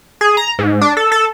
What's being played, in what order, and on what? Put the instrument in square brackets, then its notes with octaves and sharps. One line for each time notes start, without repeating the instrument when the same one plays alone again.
[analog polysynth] G#4
A#5
G#2
D4
A4
A4